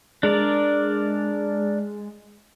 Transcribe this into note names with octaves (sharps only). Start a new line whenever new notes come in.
G#3 D4 A#4 D5